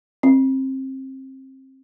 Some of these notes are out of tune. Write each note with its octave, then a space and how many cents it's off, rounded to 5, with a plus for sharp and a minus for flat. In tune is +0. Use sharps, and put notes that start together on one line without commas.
C4 +25